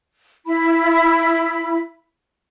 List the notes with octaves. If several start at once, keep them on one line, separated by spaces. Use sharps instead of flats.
E4 B5